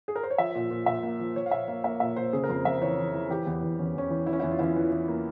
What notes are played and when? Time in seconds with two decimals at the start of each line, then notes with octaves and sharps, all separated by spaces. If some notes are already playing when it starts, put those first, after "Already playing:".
0.08 G#4
0.16 A#4
0.23 C5
0.30 C#5
0.38 F3 E5
0.55 A#2
0.71 A#2
0.86 A#2 E5
1.03 A#3
1.20 F3
1.36 F3 C#5
1.46 F5
1.51 A#2 E5
1.68 A#3 F5
1.84 A#3 E5
2.00 A#2 E5
2.16 A#2 C5
2.33 C#3 G#4
2.44 A#4
2.49 F2 C5
2.65 F2 E5
2.81 E3 C#5
2.98 E3
3.14 E3
3.30 E3 G4
3.46 E2
3.63 E2
3.79 E2 C#4
3.95 E2 C#4
4.11 E3
4.27 E3 E4
4.33 C#4
4.40 E2 E4
4.51 F4
4.59 E2 C#4 E4
4.76 E3
4.92 E3
5.08 A#3